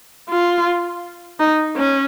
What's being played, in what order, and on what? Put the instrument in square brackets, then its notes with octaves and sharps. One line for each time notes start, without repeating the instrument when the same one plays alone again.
[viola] F4
D#4
C#4